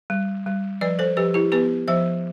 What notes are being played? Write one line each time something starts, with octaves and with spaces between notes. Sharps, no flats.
G3
G3
F3 B4 D5
A4 C5
F3 G4 B4
E4 G4
B3 G4 B4
F3 C5 E5